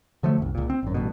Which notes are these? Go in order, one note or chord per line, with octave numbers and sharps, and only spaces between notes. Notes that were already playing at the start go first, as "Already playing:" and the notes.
D3 F3 F#3 A3
F#1 C2
C#2 A#2
C4
G#1 F#2
A1 G2 B2